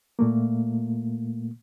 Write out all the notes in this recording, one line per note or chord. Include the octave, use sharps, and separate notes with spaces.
A#2 A3 A#3